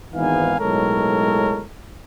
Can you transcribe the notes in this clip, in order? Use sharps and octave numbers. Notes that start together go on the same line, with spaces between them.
G#1 G#2 E3 B3 F5 G#5
B1 A2 G#3 A4 A#4 C#5